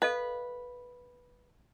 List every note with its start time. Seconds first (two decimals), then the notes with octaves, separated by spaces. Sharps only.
0.02 A4 B4 D#5 F5